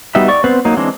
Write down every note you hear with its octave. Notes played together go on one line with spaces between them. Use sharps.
G3 B3 D#4 F#4 E5
D5 C#6
B3 C4 B4 C5
F#3 A#3 D#4
E3 G#3 C4 D4